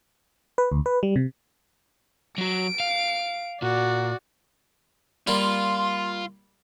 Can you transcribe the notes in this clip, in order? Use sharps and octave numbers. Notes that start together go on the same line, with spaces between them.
B4
D2
B4
G3
C3
F#3 F#4 D7
F5
A#2 F#4 D5
G3 A#3 F4 C6